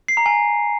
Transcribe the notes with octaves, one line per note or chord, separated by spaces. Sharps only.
C7
A#5
G#5